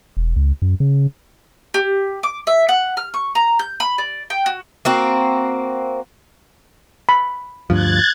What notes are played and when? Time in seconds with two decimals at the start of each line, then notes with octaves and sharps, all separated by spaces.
0.17 E1
0.36 C#2
0.62 F#2
0.80 C#3
1.74 G4
2.23 D6
2.47 E5
2.69 F#5
2.97 F6
3.14 C#6
3.35 A#5
3.59 G6
3.80 B5
3.98 D5
4.30 G5
4.46 F#4
4.85 A#3 C4 F#4
7.09 B5
7.70 D2 G2 F3 F#6 G#6 A6